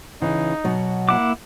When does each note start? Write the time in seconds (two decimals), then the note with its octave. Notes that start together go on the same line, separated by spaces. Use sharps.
0.22 C#3 E3 D#4
0.64 B2 F#3
1.09 A#3 E4 F#5 D6